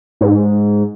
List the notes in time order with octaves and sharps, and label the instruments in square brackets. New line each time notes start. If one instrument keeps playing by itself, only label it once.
[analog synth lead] G#2